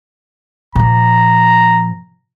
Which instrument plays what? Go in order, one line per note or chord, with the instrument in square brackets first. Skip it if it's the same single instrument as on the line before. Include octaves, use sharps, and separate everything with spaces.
[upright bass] A#2 F3 [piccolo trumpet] A#5